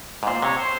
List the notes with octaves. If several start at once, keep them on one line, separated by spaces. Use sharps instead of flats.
G#2
A#2 C5
C3 C#5
C5